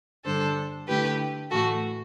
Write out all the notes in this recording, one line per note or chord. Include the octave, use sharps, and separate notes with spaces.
G2 D3 G3 D4 A4 C5
D3 A3 E4 G4 B4
A2 E3 A3 F#4 A4